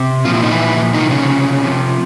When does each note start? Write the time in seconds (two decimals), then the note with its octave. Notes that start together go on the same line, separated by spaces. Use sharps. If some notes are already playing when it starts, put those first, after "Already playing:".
Already playing: C3
0.25 A#2 F3 F4
0.34 E4
0.43 D#4
0.52 E3 E4
0.94 C3 D#3 F3 D#4
1.11 C#3 C#4
1.63 C3 F3